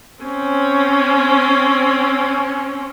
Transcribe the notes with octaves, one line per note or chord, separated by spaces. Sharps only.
C4 C#4